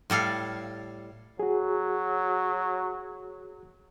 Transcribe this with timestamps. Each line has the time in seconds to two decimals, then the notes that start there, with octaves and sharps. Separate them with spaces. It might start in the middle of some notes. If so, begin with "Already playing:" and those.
0.10 A2 G3 A4 F5
1.40 F#3 F#4 G#4